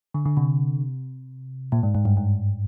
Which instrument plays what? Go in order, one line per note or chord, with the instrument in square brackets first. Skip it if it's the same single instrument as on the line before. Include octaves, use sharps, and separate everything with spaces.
[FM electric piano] D3
D3
C3
A#2
G#2
G#2
G2
G#2